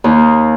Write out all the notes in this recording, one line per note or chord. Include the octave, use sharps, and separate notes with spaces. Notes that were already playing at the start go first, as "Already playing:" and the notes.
D#2